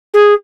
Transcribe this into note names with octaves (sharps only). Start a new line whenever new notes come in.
G#4